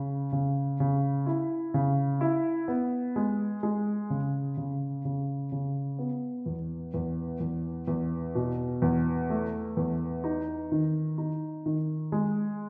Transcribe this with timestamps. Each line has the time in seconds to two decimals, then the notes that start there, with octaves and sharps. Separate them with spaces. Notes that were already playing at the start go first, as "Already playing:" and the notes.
Already playing: C#3
0.32 C#3
0.80 C#3
1.26 E4
1.74 C#3
2.21 E4
2.68 B3
3.16 G#3
3.63 G#3
4.10 C#3
4.57 C#3
5.05 C#3
5.52 C#3
5.99 B3
6.46 E2
6.94 E2
7.40 E2
7.88 E2
8.35 B2
8.82 E2
9.30 A3
9.77 E2
10.24 D#4
10.72 D#3
11.18 D#4
11.66 D#3
12.12 G#3